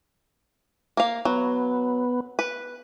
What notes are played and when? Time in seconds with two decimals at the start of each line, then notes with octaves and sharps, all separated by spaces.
0.97 A#3 F5
1.25 F#3 B3
2.39 B4